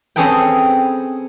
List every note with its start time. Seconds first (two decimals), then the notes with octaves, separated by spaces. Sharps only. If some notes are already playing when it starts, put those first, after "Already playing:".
0.16 C4 C#4 G#4 A4 B4 G5